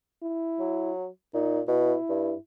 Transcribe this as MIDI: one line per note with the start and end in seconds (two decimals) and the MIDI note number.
0.23 0.92 64
0.59 1.07 54
1.34 1.61 46
1.34 1.60 63
1.68 1.95 47
1.68 2.36 64
2.09 2.33 43